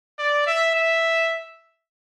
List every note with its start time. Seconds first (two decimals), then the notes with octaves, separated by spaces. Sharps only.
0.19 D5
0.47 E5
0.75 E5